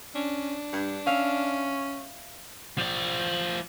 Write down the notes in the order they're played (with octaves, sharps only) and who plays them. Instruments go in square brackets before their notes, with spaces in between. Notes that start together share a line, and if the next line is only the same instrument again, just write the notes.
[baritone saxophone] C#4 [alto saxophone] D4
[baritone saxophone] G2
[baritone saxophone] C#4 [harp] E5 F5
[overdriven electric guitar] F3 D5